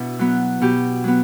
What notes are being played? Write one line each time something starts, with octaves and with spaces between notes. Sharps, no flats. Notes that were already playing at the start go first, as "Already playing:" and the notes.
Already playing: B2 D4 E4
F#3 B3
B2 G4
F#3 B3